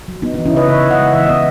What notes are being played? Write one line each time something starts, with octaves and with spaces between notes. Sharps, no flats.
F#3
B3 D#4
E3 D#4
C#4 E4
C#3 B4 D#5
C#3 C#5 E5
C#3
D#5 F#5
G#3
E3 E5
B3 D#5